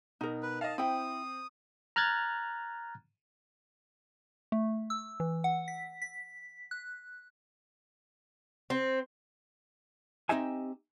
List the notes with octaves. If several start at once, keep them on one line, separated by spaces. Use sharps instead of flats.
B2 D#4 A#4
B4
D#5 F5 A5
C4 E4 G5 D#6
A#5 F6 F#6 G#6 A6
A3
E6
E3
F#5
B6
B6
F#6
C4
C4 D#4 G4 D#5 E5 G#5